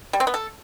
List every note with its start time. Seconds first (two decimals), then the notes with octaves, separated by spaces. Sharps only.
0.13 G3
0.20 C4
0.27 B3
0.34 A4